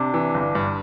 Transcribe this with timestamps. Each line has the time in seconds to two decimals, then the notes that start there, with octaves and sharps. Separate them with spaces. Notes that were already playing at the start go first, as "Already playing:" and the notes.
Already playing: C3 D4
0.14 E3
0.34 G1
0.55 G2